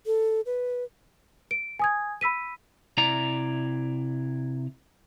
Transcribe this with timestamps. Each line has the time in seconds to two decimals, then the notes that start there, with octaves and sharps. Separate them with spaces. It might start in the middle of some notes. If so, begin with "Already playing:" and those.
0.06 A4
0.46 B4
1.51 D7
1.79 G#5 D#6 G#6
2.21 B5 E6 B6 D#7
2.97 C3 E4 D5 A#5